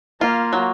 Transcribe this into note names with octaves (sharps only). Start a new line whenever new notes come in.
A#3 F4
F#3